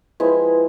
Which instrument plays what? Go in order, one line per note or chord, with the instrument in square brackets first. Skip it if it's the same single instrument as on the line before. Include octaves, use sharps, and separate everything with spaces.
[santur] F3 G#3 C4 E4 [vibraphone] B4